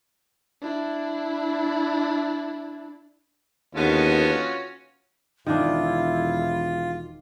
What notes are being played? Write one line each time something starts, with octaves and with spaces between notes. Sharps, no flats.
D4 E4
D#2 D3 G#3 B3 C#4 F4 F#4
E1 D#3 D4 E4 F4